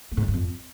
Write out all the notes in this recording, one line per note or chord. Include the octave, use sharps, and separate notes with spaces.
A3
G#2
G#3
G2
F2